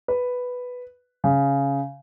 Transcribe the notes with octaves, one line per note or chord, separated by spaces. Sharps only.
B4
C#3